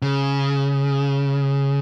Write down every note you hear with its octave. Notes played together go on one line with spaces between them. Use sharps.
C#3